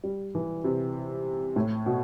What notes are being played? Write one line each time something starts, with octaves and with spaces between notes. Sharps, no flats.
G3
E3
C3
A2
B2